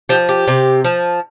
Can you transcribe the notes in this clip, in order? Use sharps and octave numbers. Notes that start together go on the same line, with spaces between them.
F3 G4
G4
C3
F3